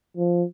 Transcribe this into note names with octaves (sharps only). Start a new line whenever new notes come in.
F3